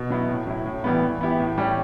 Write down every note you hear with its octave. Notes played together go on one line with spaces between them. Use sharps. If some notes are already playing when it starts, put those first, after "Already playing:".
Already playing: B2
F#3 B3 E4
A2
F#3 C#4 E4
A2
E3 G3 B3
E3
B3 E4 G4
A2
G3 C#4 G4